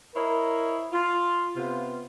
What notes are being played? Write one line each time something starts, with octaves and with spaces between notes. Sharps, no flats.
E4 A#4 C5 C#5 D#5
F4
C3 B3 F4